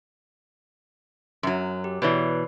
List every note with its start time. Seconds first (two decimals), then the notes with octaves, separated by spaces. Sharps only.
1.43 F#2 F#3
1.84 G4
2.02 B2 E3 B4 C#5 D5